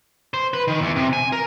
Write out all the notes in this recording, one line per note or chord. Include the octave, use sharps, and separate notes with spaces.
C5
B4
D#3
E2
C3
G#5
A#4